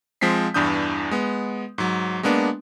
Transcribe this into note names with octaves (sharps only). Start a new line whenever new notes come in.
F3 G#3 C4 B6 C7
E2 G2 E3 D4 D#6 G6
G#3 B3
G#2 F#3
G#3 A#3 B3 D4